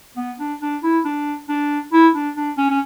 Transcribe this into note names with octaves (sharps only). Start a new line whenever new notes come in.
B3
D4
D4
E4
D4
D4
E4
D4
D4
C#4
C#4